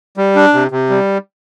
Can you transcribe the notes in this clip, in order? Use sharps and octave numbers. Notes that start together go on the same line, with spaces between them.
G3
D4
C3
C3
G3